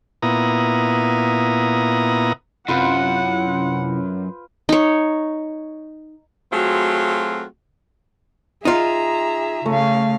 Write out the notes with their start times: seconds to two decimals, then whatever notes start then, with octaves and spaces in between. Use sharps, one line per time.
0.22 A#2 B3 E4 A#5 D#6
2.68 F#2 C3 C#4 E4 F4 B4 C5 F#5
4.69 D#4 C#5
6.52 F#3 A3 C4 F4 F#4 G#4
8.65 D#4 F4 G#4 E5 A#5
9.66 C#3 A3 F5